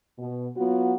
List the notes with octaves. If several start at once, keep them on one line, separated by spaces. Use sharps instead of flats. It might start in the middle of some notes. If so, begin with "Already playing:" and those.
B2
F#3 B3 F4 F#4